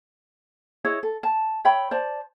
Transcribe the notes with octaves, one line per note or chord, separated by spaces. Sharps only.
E4 G#4 C#5 D#5
A4
A5
C#5 E5 G5 B5
C5 D5 A5